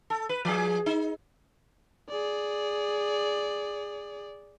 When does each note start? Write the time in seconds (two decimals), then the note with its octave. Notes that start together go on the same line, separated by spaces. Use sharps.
0.10 A4
0.29 B4
0.45 F3 G#4
0.86 D#4
2.09 G#4 D5